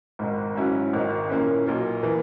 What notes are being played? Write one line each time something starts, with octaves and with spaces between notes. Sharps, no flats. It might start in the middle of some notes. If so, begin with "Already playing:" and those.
G#1 G#2 D#3
G#2 F#3 C#4 E4
G#1 G#2 D#3
A#2 A#3 C#4 E4
B1 A#2 A#3
E3 A#3